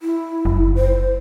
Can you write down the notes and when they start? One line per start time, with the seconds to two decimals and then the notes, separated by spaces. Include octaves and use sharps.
0.01 E4
0.45 F#1
0.76 C5